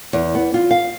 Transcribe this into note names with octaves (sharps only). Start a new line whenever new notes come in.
E2
B3
F4
F5